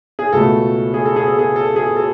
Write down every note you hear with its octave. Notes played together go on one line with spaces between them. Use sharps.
G#4
C#2 B2 A3 A4
G#4
A4
G#4
A4
G#4
A4
G#4
A4